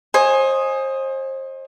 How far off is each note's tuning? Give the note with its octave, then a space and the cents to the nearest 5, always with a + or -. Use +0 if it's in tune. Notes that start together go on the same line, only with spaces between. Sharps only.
C5 +30 D#5 +0 G#5 +0